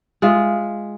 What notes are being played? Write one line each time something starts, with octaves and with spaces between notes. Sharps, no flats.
G#3 F4 E5